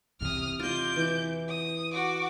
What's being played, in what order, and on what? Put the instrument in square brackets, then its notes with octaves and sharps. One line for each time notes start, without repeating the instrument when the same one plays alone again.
[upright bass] E2 C3 [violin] D#6 F6
[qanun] F4 D#5 [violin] D6 G6
[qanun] E3
[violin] D#6
F#4 D6